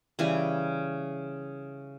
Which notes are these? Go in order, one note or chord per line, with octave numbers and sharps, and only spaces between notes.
C#3 E3 G3 G#5